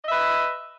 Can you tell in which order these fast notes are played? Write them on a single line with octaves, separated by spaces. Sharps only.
D#5 E5 B4